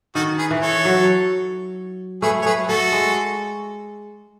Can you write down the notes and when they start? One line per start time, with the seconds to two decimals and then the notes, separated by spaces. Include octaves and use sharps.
0.15 D#3 F#4 A4
0.38 G#4 B4
0.51 E3
0.61 A4 C#5
0.85 F#3
2.22 A3 G#4 B4
2.42 C#5
2.46 A3 G#4 B4
2.68 A3 F#4 A4
2.92 G#3